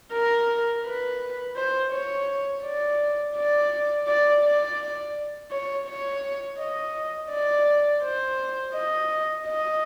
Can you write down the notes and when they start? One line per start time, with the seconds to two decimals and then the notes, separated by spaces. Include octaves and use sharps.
0.12 A#4
0.85 B4
1.57 C5
1.92 C#5
2.64 D5
3.37 D5
4.08 D5
4.44 D5
5.51 C#5
5.87 C#5
6.59 D#5
7.31 D5
8.03 C5
8.74 D#5
9.47 D#5